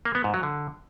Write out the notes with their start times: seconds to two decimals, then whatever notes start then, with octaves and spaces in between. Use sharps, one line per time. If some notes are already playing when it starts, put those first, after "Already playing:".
0.05 A#3
0.15 B3
0.24 G#2
0.34 F#3
0.43 D3